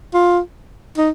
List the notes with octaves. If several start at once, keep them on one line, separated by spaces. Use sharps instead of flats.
F4
D#4